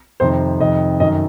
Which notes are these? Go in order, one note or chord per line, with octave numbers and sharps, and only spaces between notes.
F2 C3 D#3 C5
F2 C3 D#3 D#5
F#2 D#3 D#5